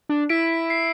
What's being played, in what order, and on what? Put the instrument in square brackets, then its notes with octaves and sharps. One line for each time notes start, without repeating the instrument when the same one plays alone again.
[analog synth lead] D4
[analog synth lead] E4 [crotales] B6 D7
[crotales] C7